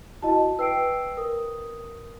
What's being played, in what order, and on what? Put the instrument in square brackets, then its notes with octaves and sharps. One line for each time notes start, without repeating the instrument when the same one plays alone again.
[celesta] E4 F#4 [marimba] D#5 A5
[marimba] B4 G5 [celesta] E6 C7 D7
[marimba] A#4 [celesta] D#6